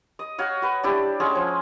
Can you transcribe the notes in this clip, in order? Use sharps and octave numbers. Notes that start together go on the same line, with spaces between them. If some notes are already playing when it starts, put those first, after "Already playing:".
D#5
F#4 C#5 F5
F#4 B4
D4 E4 G4 D5
G#3 C#4 F#4 G#4
F3